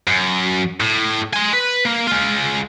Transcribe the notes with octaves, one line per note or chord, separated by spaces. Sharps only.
F#2
A2
G#5 C6
B4
A#3
G#3 F4